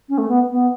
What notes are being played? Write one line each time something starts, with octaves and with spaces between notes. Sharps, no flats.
C#4
A3
B3
B3